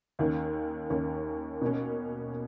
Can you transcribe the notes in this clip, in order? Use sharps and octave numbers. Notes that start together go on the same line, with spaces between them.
D#2 D#3 A#3 C#4
D#2 D#3 A#3 C#4
B2 A#3 C#4